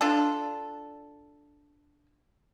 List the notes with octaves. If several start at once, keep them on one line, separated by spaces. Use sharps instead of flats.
D4 F4 A4